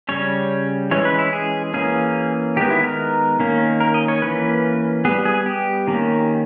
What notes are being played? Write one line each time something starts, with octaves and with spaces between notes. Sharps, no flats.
C#3 G3 C#4 C#5
E3 G#3 C#4 C#5
B4
E4
G#4
E3 A#3 C#4 G#4
D#3 G#3 B3 G4
E4
A#4
D#3 A#3 C#4
A#4
D#5
C#5
E3 A#3 C#4 B4
G3 B3 G#4
G#4
G4
D#3 A#3 C#4